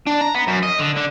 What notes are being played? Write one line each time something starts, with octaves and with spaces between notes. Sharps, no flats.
D4
A#5
B3
F#2
D#5
D3
D3